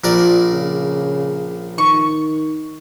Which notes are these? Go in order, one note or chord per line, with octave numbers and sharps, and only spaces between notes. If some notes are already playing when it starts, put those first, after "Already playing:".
A#1 F3 A#4 D5
C#3
D#3 C#6